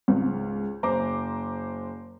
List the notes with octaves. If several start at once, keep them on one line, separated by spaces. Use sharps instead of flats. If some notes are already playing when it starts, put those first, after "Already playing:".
C#2 G#2
F#1 C5 A#5 D6